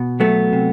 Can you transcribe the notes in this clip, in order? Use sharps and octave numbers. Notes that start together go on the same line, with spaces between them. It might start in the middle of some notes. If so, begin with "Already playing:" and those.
Already playing: B2
F#3 A3 B3
C3